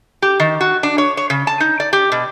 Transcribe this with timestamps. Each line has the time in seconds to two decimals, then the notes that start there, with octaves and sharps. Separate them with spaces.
0.22 G4
0.40 D#3
0.61 F#4
0.83 D4
0.98 C#5
1.17 C#5
1.30 C#3
1.47 A5
1.60 D#4
1.80 D5
1.93 G4
2.12 B2